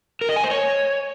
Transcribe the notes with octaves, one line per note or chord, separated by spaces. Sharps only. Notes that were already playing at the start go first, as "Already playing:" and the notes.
A#4
D#5
G#5
C5
C#5